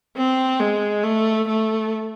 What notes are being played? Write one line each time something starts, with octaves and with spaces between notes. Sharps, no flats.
C4
G#3
A3
A3